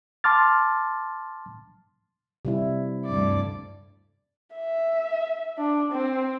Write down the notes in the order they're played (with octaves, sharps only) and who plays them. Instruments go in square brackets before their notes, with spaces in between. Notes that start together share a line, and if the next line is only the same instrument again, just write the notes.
[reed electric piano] A5 C6 D6 F6 A6
[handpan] C3 G3 E4
[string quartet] D2 G2 D5
[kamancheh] E5
D4
C4